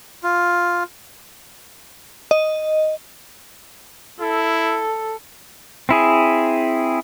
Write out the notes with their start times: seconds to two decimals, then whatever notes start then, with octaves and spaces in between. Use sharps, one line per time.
0.23 F4
2.31 D#5
4.20 E4 A4
5.89 C4 E4 G#4